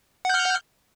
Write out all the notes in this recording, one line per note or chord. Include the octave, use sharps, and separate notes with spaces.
F#5 F6 G6